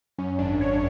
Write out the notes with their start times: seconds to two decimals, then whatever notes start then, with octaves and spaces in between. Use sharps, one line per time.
0.18 F#2 C#4
0.39 G#1 D4
0.61 G#1 C#5